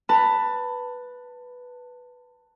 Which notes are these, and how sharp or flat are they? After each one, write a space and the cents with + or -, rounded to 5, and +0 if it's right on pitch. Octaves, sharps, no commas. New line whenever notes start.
B4 +0 A5 +20